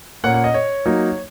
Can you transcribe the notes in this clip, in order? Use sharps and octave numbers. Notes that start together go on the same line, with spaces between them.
A#2 A#3 C#4 F#5
F#5
D#5
C#5
F#3 A#3 D#4